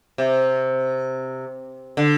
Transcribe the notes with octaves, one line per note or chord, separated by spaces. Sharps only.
C3
D3